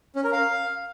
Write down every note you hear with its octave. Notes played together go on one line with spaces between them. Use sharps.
C#4
A#4
F5